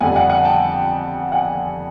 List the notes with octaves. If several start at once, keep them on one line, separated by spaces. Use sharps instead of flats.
F2 D3 G3 F#5 G#5
F#5 G#5
F#5 G#5
G5 A5
F#5 G#5